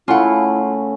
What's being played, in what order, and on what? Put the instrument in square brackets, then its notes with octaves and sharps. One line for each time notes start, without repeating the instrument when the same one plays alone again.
[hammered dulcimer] C#3 A3 [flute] E4 [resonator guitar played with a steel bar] F4 F#5